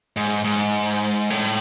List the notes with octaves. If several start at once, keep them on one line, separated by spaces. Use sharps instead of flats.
G#2
G#2
A2